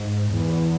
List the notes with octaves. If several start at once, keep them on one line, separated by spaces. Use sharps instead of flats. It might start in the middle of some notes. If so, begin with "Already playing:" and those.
Already playing: G#2
E2